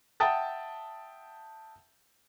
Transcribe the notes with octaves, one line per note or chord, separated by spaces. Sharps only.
E5 F#5 G5 A5 D#6 A6